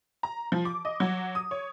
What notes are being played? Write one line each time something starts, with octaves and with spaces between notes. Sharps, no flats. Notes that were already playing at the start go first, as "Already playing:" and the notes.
A#5
F3
D6
D#5
F#3
D#6
C#5